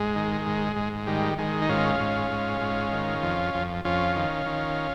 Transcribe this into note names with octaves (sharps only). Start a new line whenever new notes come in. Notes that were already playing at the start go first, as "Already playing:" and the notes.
Already playing: G#2 G#3
D#3
G#2
G#2
D#3 G3
D#3 G#3
D#4
G#2 C#4 F4
G#2
G#2
G#2
D#3
F2
F2
F2 C#4 F4
D#3
D#3